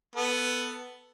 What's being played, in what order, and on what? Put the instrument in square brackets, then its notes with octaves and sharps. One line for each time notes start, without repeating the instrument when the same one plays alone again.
[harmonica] B3 A4